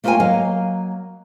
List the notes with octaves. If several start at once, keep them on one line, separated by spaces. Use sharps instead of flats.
A3 A#3 F4 C#5 G5 G#5
F#3 A#3 D#5 F5